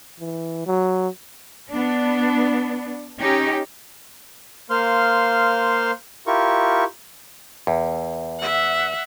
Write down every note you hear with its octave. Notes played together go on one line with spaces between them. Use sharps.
E3
F#3
B3 D4
C#4 D#4 G4
A#3 C5 F5 C6 F6
E4 F4 G4 A#4 C#6
E2
E5 F#5